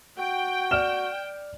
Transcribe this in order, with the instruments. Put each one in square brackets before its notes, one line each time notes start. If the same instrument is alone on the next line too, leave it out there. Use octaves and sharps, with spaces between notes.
[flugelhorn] F#4 [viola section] G5
[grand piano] D5 F6 E7